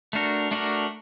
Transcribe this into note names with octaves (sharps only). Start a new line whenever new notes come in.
A3 D4 F#4 A#4
A3 D4 F#4 A#4